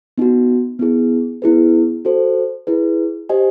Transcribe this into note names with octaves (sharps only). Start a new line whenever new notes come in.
B3 D#4 F#4
B3 E4 G#4
B3 E4 G#4 B4
F#4 A4 C5
E4 G#4 B4
G4 C5 D#5 G#5